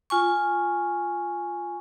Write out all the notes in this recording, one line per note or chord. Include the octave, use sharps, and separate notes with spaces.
F4 G#5 C#6